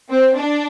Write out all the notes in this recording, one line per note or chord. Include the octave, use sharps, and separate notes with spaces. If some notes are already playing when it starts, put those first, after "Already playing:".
C4
D4